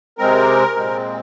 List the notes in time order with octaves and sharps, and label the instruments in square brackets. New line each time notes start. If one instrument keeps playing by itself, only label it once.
[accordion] C3 G#3 C4 A#4
A#2 G#3 C4